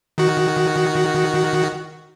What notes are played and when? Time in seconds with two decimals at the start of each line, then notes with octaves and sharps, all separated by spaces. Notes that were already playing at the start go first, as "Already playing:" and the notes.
0.18 D#3 F#4